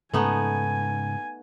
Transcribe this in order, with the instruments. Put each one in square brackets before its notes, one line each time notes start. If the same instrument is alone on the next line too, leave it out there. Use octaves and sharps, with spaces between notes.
[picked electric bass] G#2 C#3 [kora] A3 B3 D#4 [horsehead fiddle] G#5